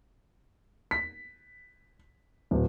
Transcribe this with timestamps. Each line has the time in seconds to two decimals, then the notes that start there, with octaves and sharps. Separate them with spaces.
0.91 B6
2.51 D1